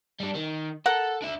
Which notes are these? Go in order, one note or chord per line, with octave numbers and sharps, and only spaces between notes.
G3 D4
D#3
A4 A#4 F#5
D4 E5